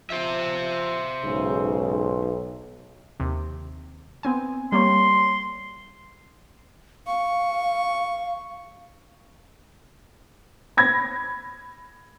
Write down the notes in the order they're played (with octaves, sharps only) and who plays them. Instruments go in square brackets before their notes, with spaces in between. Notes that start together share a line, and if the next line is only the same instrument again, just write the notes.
[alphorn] F3 [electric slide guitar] C5 E5
[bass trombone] B1 [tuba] G#2 [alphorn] C#3
[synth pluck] D#2 C3
B3 C4 G#5
[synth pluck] G3 A#3 C#5 [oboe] C6
[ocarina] F5 [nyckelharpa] C#6
[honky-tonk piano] B5 G#6 A#6